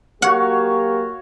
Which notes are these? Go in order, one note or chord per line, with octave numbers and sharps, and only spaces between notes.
F#3 A#3 F#4 G4 C#5 F5 F#5